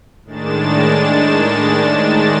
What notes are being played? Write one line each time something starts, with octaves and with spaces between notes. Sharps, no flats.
A2 D#3 G#3 D4 A6 E7